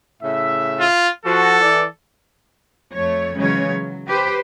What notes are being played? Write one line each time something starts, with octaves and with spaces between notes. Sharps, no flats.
A2 C#3 E5
F4
F3 F#4 A4
E3 D5
F2 A3 C#5
C#3 E3 F#3 G#3 C#4 C#5
F#3
G4 B4 C5